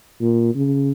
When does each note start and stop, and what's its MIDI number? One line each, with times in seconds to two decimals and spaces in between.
0.21 0.53 46
0.55 0.92 49